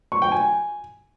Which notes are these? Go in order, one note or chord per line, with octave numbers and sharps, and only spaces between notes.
C#6
G5
G#5